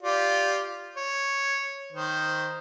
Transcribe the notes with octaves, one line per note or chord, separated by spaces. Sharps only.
F4 G4 D5
C#5
D#3 C5